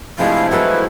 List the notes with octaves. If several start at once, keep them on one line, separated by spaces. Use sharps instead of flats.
C3 F3 G#3 A3 D4 E4 F5
F#3 G#3 A4 B4